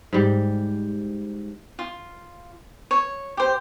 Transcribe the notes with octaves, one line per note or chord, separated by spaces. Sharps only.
G#2 G3
F4
C#5
G4 C5